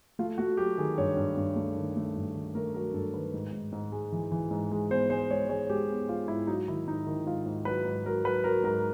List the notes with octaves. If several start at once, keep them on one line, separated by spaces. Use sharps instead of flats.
A3 F4
A3 F#4
F#3 G4
D#3 G#4
G2 C#5
G2
G2
A3
D#3
A3
G2
D#3
A3 A#4
F#3 A#4
G2 A4
D#3 B4
G#2
G#2
G#2
G#3
E3
E3
G#2
G#3
B3 C5
G#3 C5
G#3 C#5
G#3 C#5
G#3 G4
B3
G#3 F4
G#2 E4
F#3 D#4
D#3 E4
G#2 D#4
D#3 E4
G#2 F4
G#2
F#3 B4
G#2
F#3 A#4
F#3 B4
F#3 A#4
G#2 A#4